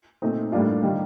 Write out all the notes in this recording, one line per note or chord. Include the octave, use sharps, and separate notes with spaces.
A#2 A3 C4 D#4
A2 G3 A#3 D4 F4
D#3 G3 A#3